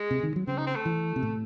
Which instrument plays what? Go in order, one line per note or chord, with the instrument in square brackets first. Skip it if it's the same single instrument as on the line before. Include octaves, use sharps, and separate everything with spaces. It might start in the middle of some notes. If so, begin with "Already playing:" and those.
Already playing: [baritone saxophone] G#3
[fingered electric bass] C3
D#3
F#3
[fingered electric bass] C#3 [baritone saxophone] C4
[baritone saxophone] D#4
C4
A3
[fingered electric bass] E3
C3
A2